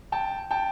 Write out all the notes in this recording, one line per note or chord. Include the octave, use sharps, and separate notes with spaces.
G5 A5
G5 A5